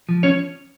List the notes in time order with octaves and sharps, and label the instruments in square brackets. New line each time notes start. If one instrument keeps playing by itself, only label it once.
[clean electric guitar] F3
C#4 C#5